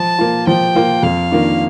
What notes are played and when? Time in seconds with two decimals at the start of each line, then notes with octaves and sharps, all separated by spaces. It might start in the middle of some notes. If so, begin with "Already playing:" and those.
Already playing: F3 A5
0.19 A#3 F4
0.47 F3 G5
0.75 A#3 F4
1.03 F2 F5
1.32 D#3 A#3 D4 F4